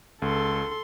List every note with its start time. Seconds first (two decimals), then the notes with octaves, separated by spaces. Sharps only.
0.22 C#2 A4 C6